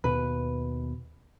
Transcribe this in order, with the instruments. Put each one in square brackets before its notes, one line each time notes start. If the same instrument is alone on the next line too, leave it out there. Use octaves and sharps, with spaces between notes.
[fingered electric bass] D#2 B2 [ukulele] B4